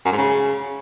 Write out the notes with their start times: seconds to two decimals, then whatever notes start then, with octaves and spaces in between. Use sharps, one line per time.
0.06 F#2
0.12 G#2
0.18 C#3